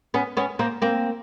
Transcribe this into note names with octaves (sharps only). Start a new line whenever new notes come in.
B3 C#4
B3 C#4
A#3 C4
A#3 C4